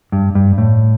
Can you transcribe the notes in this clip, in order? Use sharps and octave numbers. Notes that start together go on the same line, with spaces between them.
G2
G2
A2